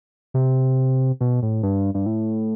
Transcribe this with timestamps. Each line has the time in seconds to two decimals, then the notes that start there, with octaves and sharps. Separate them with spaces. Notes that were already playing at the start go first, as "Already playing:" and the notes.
0.34 C3
1.21 B2
1.42 A2
1.63 G2
1.94 G2
2.06 A2